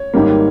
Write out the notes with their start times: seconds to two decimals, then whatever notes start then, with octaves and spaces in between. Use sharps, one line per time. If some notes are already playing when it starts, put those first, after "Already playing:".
Already playing: C#5
0.14 G#1 G#2 D#3 G3 A#3